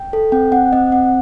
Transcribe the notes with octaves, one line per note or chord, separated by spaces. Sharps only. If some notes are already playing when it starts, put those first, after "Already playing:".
Already playing: G5
A4
C4 G5
C4 F#5
C4 D#5
C4 F#5